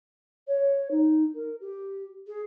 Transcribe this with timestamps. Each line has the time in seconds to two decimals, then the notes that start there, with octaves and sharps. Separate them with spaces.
0.48 C#5
0.91 D#4
1.35 A#4
1.61 G4
2.27 G#4